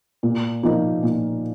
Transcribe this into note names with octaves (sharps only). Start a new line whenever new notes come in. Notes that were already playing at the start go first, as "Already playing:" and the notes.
A#2
F3 A#3 D#4
A#2